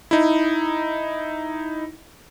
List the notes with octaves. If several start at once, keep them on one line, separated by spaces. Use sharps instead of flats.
D#4 E4